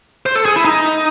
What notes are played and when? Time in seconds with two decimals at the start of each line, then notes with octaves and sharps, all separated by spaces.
0.26 C5
0.35 A4
0.46 G#4
0.56 E4
0.65 D#4